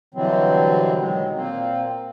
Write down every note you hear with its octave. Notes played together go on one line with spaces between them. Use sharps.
B2 D3 E3 F#3 G3 C4
D#3 F#3 G#3
A#2 A#3 C4